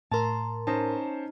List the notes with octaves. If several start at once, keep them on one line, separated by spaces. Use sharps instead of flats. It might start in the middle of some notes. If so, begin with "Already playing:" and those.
A2 A#4 A5 A#5 C6
C#4 D#4 C5 A5